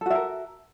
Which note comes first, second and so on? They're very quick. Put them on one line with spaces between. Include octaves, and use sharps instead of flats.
A4 F#4 E5 A#4